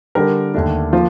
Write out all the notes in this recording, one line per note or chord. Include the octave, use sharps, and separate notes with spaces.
D3 G3 D4 G4 A#4
D#2 D3 A3 D4
F3 A#3 F4 C5